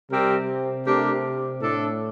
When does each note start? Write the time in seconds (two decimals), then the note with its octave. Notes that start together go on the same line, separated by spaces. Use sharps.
0.10 C3 G3 C4 G4 A#4
0.85 C3 A3 D4 G4 A#4
1.61 A2 A3 D4 A4